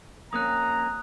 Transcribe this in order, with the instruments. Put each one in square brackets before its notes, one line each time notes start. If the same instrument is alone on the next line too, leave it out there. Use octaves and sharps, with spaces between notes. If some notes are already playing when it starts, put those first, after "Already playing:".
[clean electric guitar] F2 A#3 C#4 [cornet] A#5 [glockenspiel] D#6 F#6